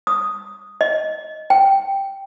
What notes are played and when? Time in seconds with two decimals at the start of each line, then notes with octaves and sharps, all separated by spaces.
0.07 D#6
0.81 D#5
1.50 G5